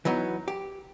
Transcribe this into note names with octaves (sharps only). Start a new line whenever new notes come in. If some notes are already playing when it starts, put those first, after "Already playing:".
E3 F#3 B3 D#4
G4